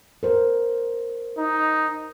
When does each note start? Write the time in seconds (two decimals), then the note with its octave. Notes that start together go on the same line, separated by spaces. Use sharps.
0.23 A#4 C5
1.38 D#4